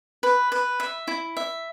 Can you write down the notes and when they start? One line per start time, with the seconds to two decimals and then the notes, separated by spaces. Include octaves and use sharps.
0.23 B4
0.52 B4
0.80 E5
1.08 E4
1.37 E5